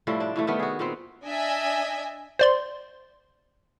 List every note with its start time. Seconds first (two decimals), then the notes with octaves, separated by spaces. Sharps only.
0.07 A2 F3 G3 E4
0.20 D4
0.36 A2 E3 A3
0.47 D#3 G3 A3 B3
0.59 F#4 G#4
0.79 A#2 B3 C4
1.25 D4 D#5 E5 G#5
2.39 C5 D5 C6